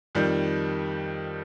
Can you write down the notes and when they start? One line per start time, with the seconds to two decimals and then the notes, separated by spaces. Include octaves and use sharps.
0.15 F2 D#3 G3